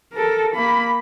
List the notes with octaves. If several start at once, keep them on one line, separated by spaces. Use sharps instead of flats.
A4 A#4
A#3 B5